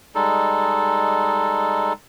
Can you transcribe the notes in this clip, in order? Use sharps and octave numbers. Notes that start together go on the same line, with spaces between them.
G3 G#3 D#4 A4